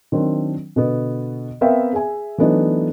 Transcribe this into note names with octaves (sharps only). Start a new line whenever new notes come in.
D#3 F#3 C4 D4
B2 D3 B3
B3 C4 A#4 E5 F5 G5
G#4 E5 G#5
E3 F#3 A3 B3 D4 D#4